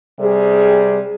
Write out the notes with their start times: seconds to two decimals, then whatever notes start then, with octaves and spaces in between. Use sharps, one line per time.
0.20 C3 G3 C4 G#4